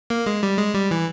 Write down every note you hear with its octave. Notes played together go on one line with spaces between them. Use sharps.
A#3
G#3
G3
G#3
G3
E3